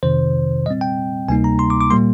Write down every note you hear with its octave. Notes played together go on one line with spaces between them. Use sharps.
F2 C3 D#3 C5
A#2 G3 C4 D#5
G5
D2 C3 G3 A#3 D#4 G#5
A#5
C6
D6
D6
A#2 G3 A#3 C6